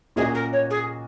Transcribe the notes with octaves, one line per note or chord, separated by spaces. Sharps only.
A#2 A#3 C#4 F#4 G#4 D#5
A#4
C#5
G#4